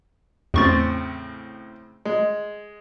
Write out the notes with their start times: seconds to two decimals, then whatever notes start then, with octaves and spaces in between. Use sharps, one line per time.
0.54 E2 A2 C#3 C4 C#6 A6
2.05 G#3